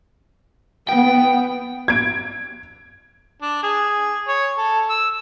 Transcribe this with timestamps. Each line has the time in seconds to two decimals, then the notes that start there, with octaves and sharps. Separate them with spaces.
0.89 B3 G5
1.88 G#6 D7
3.42 D4
3.63 G#4
4.28 C#5
4.58 A4
4.90 E6